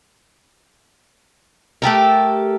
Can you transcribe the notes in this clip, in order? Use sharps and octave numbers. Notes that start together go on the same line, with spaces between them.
A3 G4 A4 A#4